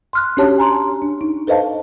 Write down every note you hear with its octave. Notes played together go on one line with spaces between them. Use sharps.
C6 F6 F#6
C#4 D4 F#4 G4 C#5 A5
G#5 A#5 C6
D4
D#4
A4 B4 C5 D#5 F5 A5